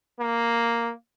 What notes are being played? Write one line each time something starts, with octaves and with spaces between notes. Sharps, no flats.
A#3